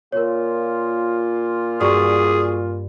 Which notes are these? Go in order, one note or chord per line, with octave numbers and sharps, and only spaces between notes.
A#2 F4 A#4 C#5
G2 F#4 G#4 D5 C#6